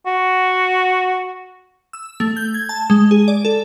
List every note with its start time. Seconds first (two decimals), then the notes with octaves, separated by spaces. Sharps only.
0.07 F#4
1.93 E6
2.20 A3
2.37 G6
2.54 G#6
2.69 A5
2.90 G#3
3.11 G#4
3.28 D5
3.45 A4